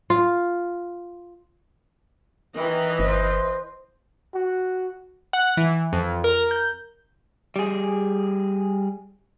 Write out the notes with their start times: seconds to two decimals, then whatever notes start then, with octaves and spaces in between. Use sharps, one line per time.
0.10 F4
2.56 D#3 E3 B4 D#5
2.99 G1 C5
4.35 F#4
5.33 F#5
5.57 E3
5.93 F2
6.24 A#4
6.51 G6
7.56 G3 G#4